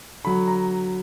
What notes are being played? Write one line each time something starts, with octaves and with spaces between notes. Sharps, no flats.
D3 F#3 B5
A#5